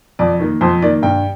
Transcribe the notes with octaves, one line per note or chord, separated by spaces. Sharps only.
F2 D5
D#3 A#3
F2 C5
D#3 A#3 D5
G2 G5